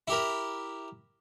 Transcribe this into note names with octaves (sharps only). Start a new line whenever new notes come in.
E4 G4 A#4